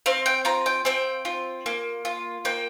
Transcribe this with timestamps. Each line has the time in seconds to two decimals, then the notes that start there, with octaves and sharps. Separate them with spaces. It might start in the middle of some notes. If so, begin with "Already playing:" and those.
0.06 C4 F5
0.26 G5
0.45 F4 A#5
0.66 G5
0.85 C4 G5
1.25 F4
1.66 A#3
2.05 F4
2.45 A#3 G5